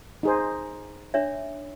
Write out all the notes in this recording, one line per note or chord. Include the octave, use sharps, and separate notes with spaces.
D#4 G#4 C5
D4 C#5 E5